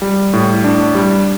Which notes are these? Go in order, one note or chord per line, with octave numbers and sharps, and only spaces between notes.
G3
A2
D4
G3